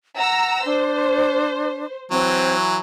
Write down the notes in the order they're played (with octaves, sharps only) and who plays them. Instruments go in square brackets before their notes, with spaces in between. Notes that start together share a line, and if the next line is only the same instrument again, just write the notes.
[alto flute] F#5 [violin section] A#5 E6
[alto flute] D4 [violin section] C5
[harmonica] E3 F#3 [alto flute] C4